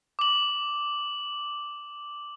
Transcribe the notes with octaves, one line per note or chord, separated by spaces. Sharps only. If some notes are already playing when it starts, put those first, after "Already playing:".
D6 F#7